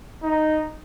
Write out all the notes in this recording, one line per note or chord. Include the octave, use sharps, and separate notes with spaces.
D#4